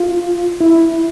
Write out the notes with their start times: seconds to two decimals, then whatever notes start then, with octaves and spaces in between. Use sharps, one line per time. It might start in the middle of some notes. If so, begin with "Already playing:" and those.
Already playing: F4
0.61 E4